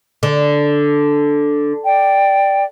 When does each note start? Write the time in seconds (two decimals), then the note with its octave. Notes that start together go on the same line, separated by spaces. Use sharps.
0.23 D3
1.85 D5 G5